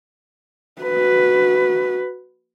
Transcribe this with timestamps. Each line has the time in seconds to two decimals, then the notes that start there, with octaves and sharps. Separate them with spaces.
0.82 F#4 B4